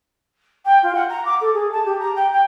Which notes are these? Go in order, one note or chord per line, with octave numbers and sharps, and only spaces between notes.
G5
F4
F#5
A#5
D6
A4
G#4
A5
G4
A#5
G5
G5